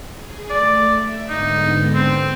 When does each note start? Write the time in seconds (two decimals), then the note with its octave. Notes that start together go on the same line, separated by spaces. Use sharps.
0.13 G#4
0.50 A3 D5
0.94 E5
1.29 G#2 D3 B3 D#4
1.94 C4